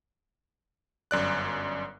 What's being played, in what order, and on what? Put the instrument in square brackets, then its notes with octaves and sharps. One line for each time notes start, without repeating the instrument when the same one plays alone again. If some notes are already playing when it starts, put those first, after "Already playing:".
[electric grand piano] G1 F#2 D5 F#6